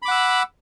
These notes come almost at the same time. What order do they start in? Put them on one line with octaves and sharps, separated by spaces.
B5 D6 F#5 E6